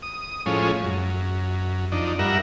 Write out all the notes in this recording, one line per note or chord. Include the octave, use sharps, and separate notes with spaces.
D#6
A2 F3 G#3 C#4
F#2
F2 D4 D#4
G2 A#4 E5 F#5